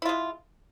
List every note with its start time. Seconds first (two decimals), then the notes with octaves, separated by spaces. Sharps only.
0.02 E4
0.05 F4
0.09 G#3